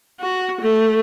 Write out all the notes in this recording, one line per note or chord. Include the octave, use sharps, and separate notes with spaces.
F#4
A3